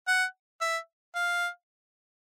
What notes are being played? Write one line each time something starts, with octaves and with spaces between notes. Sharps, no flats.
F#5
E5
F5